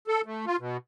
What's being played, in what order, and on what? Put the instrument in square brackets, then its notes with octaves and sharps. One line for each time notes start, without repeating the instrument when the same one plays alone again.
[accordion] A4
A3
F4
B2